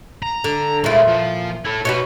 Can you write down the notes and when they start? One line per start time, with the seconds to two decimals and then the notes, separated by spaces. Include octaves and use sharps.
0.22 A#5
0.44 D3
0.84 A#2 G#3 E4 F4
1.08 F3
1.65 E4 A4
1.85 B2 D#4 F#4 B4 C#5